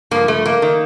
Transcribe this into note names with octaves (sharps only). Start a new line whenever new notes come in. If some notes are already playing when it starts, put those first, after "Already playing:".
G2 F3 A#3
A3
A#3
D#3